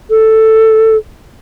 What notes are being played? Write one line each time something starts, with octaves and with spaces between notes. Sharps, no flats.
A4